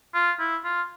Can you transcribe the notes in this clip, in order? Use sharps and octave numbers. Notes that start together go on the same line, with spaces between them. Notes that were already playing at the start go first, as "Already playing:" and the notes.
F4
E4
F4